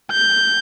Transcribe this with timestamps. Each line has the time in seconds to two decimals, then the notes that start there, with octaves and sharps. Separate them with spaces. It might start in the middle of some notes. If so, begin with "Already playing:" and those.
0.12 G6